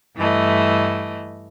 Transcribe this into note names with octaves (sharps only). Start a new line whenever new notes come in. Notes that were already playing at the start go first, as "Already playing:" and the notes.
G2 E3 A3 D#5